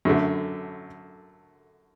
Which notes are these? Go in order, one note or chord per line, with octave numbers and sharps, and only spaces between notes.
F#2 D3 A3